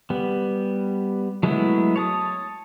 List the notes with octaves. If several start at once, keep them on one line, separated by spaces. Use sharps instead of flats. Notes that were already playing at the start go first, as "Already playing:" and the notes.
G3 B3
F#3 G#3 A3 B3 E4
C#5 A5 D#6